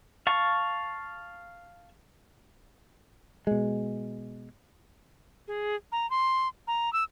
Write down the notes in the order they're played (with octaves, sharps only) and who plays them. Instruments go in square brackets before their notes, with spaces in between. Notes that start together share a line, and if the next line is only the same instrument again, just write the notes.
[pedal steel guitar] F5 A5 C#6
[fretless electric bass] B2 G#3
[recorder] G#4
A#5
C6
A#5
E6